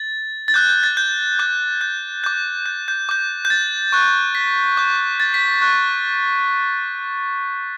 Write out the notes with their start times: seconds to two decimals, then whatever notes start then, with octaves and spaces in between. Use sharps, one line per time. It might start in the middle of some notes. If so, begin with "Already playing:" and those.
Already playing: A6
0.48 A6
0.54 D6 F#6 G6
0.69 G6
0.83 A6
0.97 G6
1.39 D6 G6
1.81 G6
2.24 D6 G6
2.66 G6
2.88 G6
3.09 D6 G6
3.45 G6
3.50 A6
3.92 C#6 F#6
4.35 B6
4.77 D6 G6
5.20 A6
5.34 B6
5.61 C#6 F#6